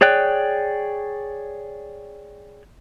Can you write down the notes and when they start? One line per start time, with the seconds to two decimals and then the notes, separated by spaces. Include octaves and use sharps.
0.01 G#4 C#5 D5 G5 F#6